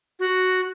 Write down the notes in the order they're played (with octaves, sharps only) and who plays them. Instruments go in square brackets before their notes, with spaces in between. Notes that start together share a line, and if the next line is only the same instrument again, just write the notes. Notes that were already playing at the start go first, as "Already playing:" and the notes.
[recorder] F#4